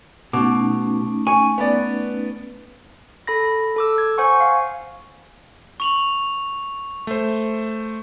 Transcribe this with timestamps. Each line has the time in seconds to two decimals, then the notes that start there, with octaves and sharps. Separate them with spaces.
0.33 B2 A3 C#4 D#4 D6
1.27 G#5 C#6
1.58 B3 B4 D5
3.27 A4 B5 A#6
3.76 A4 D6 E6
3.98 G#6
4.18 C5 F#5 G#5 C#6
4.40 F5
5.80 C#6 F7 F#7
7.07 A3 C5